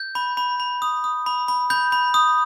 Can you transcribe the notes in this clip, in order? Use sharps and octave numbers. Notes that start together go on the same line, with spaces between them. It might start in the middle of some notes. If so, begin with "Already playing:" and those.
Already playing: G6
B5
B5
B5
D#6
D#6
B5
B5
B5 G6
B5
D#6